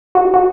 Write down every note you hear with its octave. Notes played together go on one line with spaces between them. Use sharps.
F#4
F#4